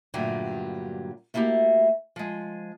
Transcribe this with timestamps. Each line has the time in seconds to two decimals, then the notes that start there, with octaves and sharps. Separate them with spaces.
0.14 G2 A#2 D3 F#3 G3 A3
1.34 A3 A#3 E4 F#4 G4
2.16 F3 G#3